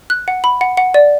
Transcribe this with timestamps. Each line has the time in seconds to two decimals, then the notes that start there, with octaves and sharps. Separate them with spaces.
0.10 F#6
0.28 F#5
0.44 B5
0.61 F#5
0.77 F#5
0.94 D5